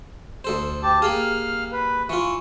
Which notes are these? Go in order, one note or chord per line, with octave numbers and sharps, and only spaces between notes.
D2 A4 C5
G4 A5
A#3 G4 G#4 F5 F6
B4
E3 F4 C#6